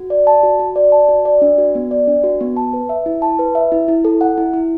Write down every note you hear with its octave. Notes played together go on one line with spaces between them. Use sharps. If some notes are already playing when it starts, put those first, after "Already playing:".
Already playing: F#4
D5
A5
F#4
F#4
D5
A5
F#4
D5
D4
F#4
B3
D5
D4
F#4
B3
A5
B4
E5
E4
A5
B4
E5
E4
E4
A4
F#5
E4
E4